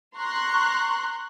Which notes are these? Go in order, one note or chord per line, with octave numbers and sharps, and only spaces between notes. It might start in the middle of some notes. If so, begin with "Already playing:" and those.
A#5 C6 C#6 F#6